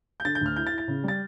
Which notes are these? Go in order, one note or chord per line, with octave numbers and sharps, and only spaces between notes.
G6
D3 A6
G6
D2 F6
E4 G6
A6
E4
A6
C#3
G3 A6